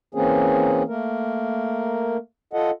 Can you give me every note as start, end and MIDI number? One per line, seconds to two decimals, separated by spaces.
0.15 0.83 52
0.15 0.83 58
0.15 0.83 60
0.15 0.83 61
0.15 0.83 68
0.88 2.17 57
0.88 2.17 58
0.88 2.17 70
2.53 2.71 65
2.53 2.71 69
2.53 2.71 75
2.53 2.71 78